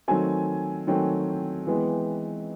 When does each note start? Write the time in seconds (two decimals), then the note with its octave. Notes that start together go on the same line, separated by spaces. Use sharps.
0.08 D#3 F#3 A3 C4 G#5
0.87 D#3 F#3 A3 C4 G5
1.67 E3 G#3 B3